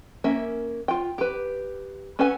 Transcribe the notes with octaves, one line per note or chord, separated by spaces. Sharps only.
A#3 C#4 E5
F4 G5
G4 B4
C#4 A4 B4 F#5 G#5